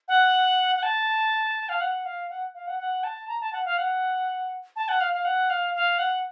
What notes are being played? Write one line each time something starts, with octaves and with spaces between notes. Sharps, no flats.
F#5
F#5
A5
F5
F#5
F5
F#5
F5
F#5
F#5
A5
A#5
A5
F#5
F5
F#5
A5
F#5
F5
F5
F#5
F5
F5
F#5